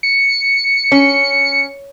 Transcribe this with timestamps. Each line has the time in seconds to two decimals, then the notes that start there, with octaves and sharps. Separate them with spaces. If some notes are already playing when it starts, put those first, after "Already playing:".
0.03 C#7
0.92 C#4